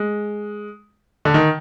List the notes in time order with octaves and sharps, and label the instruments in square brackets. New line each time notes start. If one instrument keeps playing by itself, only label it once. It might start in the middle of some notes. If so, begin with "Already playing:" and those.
Already playing: [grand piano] G#3
D3
D#3